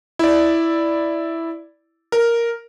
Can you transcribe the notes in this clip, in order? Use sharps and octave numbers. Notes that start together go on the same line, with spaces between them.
E4 D5
A#4